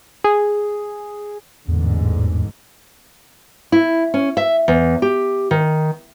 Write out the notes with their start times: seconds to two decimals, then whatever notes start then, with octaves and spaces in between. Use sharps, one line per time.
0.24 G#4
1.68 A1 E2 G#2 D3
3.72 E4
4.14 C#4
4.37 E5
4.68 E2
5.02 G4
5.51 D#3